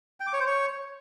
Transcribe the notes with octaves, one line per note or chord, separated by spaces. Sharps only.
G5
D6
C#5
C5
C#5